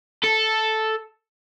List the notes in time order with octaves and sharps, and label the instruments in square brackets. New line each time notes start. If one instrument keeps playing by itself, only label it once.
[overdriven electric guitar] A4